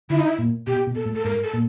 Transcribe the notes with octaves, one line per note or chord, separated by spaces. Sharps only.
D3 E4
D#4
E4
A#2
B2 G4
B2
A4
A2
A4
G#2 A#4
A4
A#2